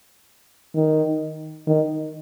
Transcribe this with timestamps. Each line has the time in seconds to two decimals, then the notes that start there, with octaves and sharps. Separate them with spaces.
0.75 D#3
1.67 D#3